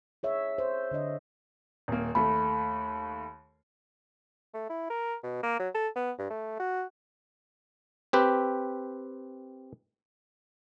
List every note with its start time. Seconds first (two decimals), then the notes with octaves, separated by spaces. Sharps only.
0.23 G#4 C#5 E5
0.58 C5
0.91 D3 D4 D#5
1.88 D#1 A#3
2.15 D#2 A3 B5
4.54 A3
4.70 E4
4.90 A#4
5.23 B2
5.43 A#3
5.59 F#3
5.75 A4
5.96 B3
6.18 G2
6.30 A3
6.60 F#4
8.13 C4 G4 B4